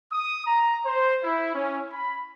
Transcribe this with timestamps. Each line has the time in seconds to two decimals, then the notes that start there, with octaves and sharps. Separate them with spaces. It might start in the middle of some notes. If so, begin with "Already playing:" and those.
0.13 D#6
0.45 A#5
0.85 C5
1.24 E4
1.54 C#4
1.91 B5